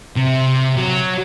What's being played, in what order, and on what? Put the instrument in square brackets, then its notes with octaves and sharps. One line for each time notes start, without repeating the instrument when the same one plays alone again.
[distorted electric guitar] C3
F#3